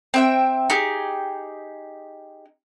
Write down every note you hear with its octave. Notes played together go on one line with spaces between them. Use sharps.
C4 E5 G5
D#4 G4 G#4